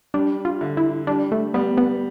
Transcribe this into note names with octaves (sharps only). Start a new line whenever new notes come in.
G3 D4
F4
D3
E4
G3 D4
A3
G3 B3
B3